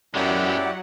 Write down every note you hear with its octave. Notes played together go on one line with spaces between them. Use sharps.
F#2 F#3 G#3 B3 E4 G4 D5 F#5